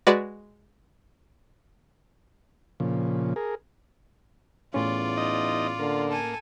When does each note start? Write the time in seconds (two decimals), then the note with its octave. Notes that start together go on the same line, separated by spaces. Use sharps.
0.07 G#3 F#4 B4 D5
2.80 A#2 C#3 F3
3.36 G#4 A#4
4.74 E2 A2 C#4 F4 D5
5.17 D#4 D#5
5.79 D3 A#3
6.09 A4 G#5